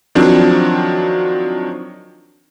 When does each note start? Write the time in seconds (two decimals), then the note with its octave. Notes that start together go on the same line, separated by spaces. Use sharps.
0.15 D#3 F3 F#3 C4 D4